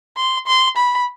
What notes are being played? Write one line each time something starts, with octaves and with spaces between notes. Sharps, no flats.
C6
C6
B5